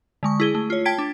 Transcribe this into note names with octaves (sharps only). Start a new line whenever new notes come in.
D3 G#3 C#6
E4 G#4 G7
A3
F4 C#5
G5 A5 G#6 B6 D7
D4